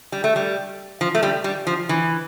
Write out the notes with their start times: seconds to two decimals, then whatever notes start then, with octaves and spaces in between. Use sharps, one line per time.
0.12 G3
0.24 A3
0.36 G3
1.01 F3
1.15 A3
1.23 G3
1.44 G3
1.67 F3
1.89 E3